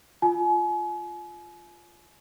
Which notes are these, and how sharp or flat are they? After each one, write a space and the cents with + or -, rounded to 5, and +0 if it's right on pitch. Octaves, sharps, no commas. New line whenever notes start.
F4 -5 G#5 +35